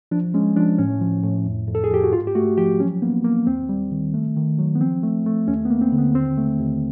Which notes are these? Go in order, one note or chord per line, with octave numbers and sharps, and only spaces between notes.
F3 D4
G#3 C#4
F3 D4
A2 C#4
F3
A2
F2
F2
A4
G#4
F2 G4
F#4
G#2 F4
G4
A3 F#4
F3 G4
F#3 C#4
A#3 B3
A#3
D#2 C4
G3
D#3
A3
D#3
F#3
B3
F3 C4
A3
A3
D#2 C#4
B3
A#3
C4
D3
B3
D#2 C4
A3
D#2